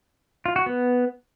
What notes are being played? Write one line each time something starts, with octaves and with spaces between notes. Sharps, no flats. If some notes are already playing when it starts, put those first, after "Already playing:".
F4
F#4
B3